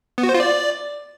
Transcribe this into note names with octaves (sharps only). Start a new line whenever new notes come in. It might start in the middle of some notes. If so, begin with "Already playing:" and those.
B3
F#4
C5
F4
D5